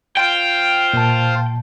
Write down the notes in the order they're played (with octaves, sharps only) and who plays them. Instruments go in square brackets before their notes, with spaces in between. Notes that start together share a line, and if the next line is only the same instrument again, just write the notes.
[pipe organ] F4 C5 F5 [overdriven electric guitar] G5
[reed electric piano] A#2 A5